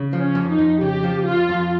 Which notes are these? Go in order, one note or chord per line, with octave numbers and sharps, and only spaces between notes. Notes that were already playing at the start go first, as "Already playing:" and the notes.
Already playing: C#3
F3
C#4
F2
D#4
F2
C#3 G4
F3
F2 F4
F2